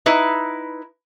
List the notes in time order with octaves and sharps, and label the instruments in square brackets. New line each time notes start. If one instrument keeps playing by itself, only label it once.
[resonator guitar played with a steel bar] D#4 E4 B4